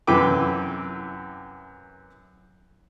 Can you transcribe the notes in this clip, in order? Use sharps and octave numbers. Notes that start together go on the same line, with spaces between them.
F#2 C3 E3 B4 G5 D6